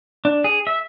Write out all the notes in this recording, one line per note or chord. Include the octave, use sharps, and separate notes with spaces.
D4
G#4
E5